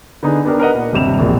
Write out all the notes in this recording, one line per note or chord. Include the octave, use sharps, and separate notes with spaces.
D3 B3 D4 D#4 G#4
B3 D4 G4 A#4
A#4 B4 D#5 F#5
A#2
D#1 G2 C3 E7 F7
E1 A#1 A#2